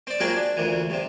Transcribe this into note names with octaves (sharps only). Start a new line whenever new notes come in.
C4 D5
F#3 A#3 C4 D4 F4 G#4
D4
D2 A#2 E3
G2 C3